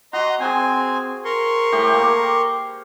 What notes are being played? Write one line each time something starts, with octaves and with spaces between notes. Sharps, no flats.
F#4 D#5 A#5 C6
C4 G#4 C5 G#5
A#4 C6 C#6
A2 A3 G4
A#3